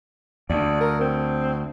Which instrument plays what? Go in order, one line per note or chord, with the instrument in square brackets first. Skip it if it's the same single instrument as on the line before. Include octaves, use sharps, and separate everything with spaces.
[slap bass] D2 [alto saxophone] D5
[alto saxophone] A#4
C4